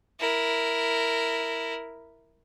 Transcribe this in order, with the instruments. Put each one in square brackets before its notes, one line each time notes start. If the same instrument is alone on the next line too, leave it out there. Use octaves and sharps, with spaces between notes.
[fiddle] E4 A#4